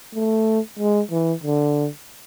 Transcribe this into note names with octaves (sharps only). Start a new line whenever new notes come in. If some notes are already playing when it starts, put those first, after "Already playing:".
A3
G#3
E3
D3